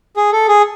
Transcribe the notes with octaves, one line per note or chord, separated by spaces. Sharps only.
G#4
A4
G#4